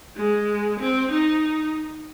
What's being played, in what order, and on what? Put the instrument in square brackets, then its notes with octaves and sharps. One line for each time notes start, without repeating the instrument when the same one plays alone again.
[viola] G#3
C4
D#4